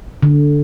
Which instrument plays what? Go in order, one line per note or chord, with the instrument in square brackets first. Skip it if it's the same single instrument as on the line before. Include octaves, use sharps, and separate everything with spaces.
[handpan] D3